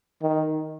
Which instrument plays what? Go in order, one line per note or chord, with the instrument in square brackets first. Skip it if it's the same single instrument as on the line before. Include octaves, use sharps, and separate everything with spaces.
[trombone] D#3